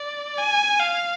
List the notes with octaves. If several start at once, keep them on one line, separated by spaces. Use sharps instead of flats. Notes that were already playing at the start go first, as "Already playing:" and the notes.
Already playing: D5
G#5
F5